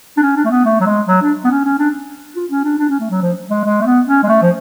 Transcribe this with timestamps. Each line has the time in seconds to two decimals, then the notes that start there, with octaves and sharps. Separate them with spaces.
0.17 D4
0.23 C#4
0.36 D4
0.45 A3
0.51 B3
0.65 A3
0.80 F#3
0.86 G#3
1.08 F#3
1.22 D4
1.44 B3
1.51 C#4
1.65 C#4
1.79 D4
2.36 F4
2.51 C#4
2.65 D4
2.79 D4
2.89 C#4
3.00 A3
3.11 F#3
3.22 F3
3.50 G#3
3.64 G#3
3.81 A3
3.86 B3
4.07 C#4
4.23 G#3
4.29 A3
4.42 F3